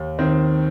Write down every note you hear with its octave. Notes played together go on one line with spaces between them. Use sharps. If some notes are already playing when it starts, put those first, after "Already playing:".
Already playing: D#2
D#3 C4